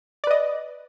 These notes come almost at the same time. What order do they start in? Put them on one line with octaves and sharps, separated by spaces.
D5 B4 D#5